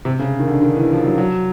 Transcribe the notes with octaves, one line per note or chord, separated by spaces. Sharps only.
C3
C#3
D#3
D3
D#3
E3
F3
F#3
F#3